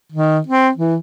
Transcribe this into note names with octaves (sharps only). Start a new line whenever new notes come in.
D#3
C4
E3